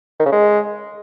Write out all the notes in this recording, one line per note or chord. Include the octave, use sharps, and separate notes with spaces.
D#3
C#3
G#3